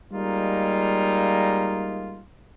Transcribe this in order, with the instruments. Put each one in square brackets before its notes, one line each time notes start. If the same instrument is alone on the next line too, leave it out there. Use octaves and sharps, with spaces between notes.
[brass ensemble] G3 G#3 A#3 D#4 F4